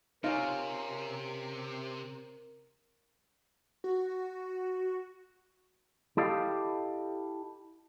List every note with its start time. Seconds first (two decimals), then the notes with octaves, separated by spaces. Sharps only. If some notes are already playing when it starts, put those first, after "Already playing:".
0.24 C3 C#4 D#4 F4 A#4
3.84 F#4
6.17 E4 G4 A4 D#5 F5 G5